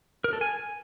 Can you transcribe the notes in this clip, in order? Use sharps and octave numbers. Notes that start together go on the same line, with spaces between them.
A#4
A4
G#5